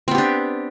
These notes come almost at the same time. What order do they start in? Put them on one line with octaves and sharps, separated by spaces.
C4 B3 G4 D4